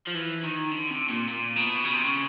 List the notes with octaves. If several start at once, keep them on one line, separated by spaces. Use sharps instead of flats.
F3
E3
D#3
D3
C3
A#2
A#2
B2
C#3
C3
C#3